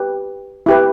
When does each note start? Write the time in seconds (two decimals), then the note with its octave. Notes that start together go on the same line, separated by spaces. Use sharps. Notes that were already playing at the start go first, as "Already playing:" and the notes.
Already playing: G4 B4
0.66 E4 G4 B4